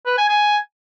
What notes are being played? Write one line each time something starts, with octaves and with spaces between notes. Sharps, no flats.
B4
G#5
G#5